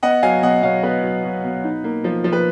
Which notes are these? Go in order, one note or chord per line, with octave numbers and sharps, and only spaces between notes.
B3 D#5 F#5
F#3 F5 G#5
B2 D#5 F#5
B2 C#5 F5
B3 B4 D#5
F#3
B2
B2
D#4
A#3
F3
F3
B4